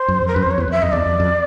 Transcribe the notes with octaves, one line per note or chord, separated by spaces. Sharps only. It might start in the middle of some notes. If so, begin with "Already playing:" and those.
Already playing: C5
F#2
F2
A#4
F#2 B4
C5
F2 C#5
E2 B4
F2 E5
F2 D#5
E2 D5
F2
F2